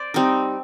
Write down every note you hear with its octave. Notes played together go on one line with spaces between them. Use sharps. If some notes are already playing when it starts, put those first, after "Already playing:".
Already playing: C5 D5
G3 C4 D#4